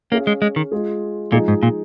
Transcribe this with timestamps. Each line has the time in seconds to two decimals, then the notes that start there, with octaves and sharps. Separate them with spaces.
0.11 A#3 C#4 G#4 F5
0.27 G#3
0.42 G#3
0.56 D#3
0.72 G#3 F4 G#4
1.32 A#2 F3 G#3 D#4 G#4
1.48 G#2
1.63 A#2